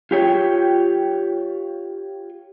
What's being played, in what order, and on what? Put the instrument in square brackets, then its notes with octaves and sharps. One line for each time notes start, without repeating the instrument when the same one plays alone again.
[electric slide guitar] F4 G4 C#5 G5